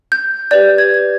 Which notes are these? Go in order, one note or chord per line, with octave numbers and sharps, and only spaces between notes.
G6
G4 B4 D5 G6
G#6
G#6